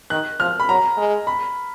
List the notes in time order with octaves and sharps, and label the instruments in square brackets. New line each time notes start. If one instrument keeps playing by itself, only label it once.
[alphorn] D#3 [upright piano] F#6
[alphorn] F3 [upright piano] F6
[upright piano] B5
[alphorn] F#3 [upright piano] A#5
[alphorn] G#3
[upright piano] B5